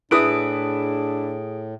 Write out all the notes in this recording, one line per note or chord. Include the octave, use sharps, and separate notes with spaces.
A2 D4 E4 G#4 B4 D#6 D7